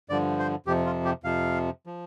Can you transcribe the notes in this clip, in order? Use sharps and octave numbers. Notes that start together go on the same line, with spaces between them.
G2 D3 F3 D5
C5
F2 C3 F3 G4
F4
G4
F2 C3 F3 F5
F3